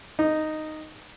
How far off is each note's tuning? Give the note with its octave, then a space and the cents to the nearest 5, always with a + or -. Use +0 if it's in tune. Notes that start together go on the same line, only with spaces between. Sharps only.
D#4 -5